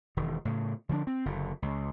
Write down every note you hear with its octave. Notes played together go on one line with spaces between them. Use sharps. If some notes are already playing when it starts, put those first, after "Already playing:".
E1 D#3
A2 C#3
D3 F3 A3 D4
C4
F#1 D3
C#2